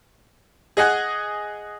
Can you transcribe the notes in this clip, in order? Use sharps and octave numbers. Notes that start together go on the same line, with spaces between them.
G#4 D#5 F#5 G#5 F#6